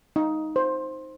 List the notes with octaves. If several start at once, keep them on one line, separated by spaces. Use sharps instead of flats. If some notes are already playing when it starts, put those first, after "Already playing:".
D#4
C5